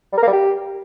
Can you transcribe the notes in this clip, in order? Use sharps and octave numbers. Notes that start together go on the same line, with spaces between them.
G3
A#4
A#3
G3
G4